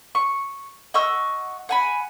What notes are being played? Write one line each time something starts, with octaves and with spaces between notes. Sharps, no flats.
C#6
D#5 F#5 C#6 E6
F#5 G#5 B5